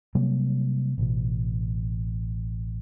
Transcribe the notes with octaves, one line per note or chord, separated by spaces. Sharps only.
C3 F#3 G3 A#3
A1 B2